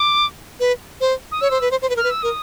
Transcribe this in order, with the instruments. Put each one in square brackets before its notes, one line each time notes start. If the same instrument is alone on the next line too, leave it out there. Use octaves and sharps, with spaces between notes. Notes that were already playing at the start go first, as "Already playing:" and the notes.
Already playing: [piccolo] D6
[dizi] B4
C5
[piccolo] D#6
[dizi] C#5 [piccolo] E6
[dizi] C5
B4
C5
C5
B4
[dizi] A#4 [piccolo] F6
[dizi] B4
[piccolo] E6
[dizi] A#4 [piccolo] D#6